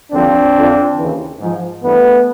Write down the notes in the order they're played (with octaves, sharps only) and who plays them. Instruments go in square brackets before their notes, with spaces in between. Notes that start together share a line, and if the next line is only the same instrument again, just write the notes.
[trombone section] D#2 D3 F3 C4 D4
F2 D3 F3
D#2 C#3 E3
G#2 F3
G2 E3 A3 B3